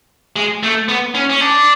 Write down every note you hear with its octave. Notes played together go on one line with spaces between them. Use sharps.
G#3
A3
B3
C#4
C#4
D4